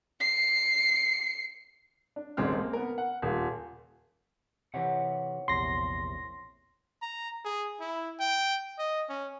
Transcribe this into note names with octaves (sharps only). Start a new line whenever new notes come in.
C7 C#7
D4
D#1 G#1 C#3 G#3 C4 F6
A#3
B3 A#4
F#5
D#1 F4
C3 E3 C#5 E5 F#5
A#1 E2 C3 C6 A#6
A#5
G#4
E4
G5
D#5
C#4